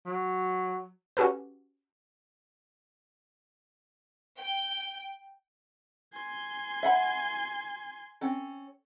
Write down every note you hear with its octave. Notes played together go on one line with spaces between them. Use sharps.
F#3
C#4 F#4 G4 A4 B4
G5
G#5 C6
E5 F#5 B5
C4 C#4 A4